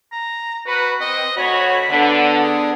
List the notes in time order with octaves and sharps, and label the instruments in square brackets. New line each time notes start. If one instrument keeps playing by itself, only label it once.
[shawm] A#5
[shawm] F#4 [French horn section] B4
[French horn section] C4 [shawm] D#5
[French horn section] D2 F#4 C#5 [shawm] B5
[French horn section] D3 [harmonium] B3 D4
[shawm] G#4